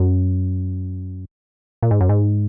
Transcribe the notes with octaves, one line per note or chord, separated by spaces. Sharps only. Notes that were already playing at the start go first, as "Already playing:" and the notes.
Already playing: F#2
A#2
G#2
F#2
G#2